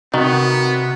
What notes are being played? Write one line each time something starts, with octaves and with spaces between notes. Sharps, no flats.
C3 D#3 B3 F#4